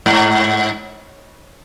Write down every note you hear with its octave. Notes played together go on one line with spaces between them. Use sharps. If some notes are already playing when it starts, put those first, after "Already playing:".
G#2